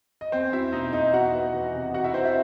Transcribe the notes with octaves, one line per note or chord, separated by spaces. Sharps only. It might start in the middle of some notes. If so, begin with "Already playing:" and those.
D#5
E2 C4 C5
F#3 E4 E5
B2 D#4 D#5
E2 D#4 D#5
D#4 F#4 F#5
B3
E3
C3
D#4 F#4 F#5
E4 E5
B3 C4 C5
E4 E5